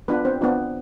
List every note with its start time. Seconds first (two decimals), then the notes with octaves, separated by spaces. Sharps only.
0.08 B3 D4 F4 B4
0.25 C4 C5
0.41 B3 D4 F4